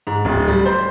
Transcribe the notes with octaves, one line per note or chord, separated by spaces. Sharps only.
G#2
D1
G3
C5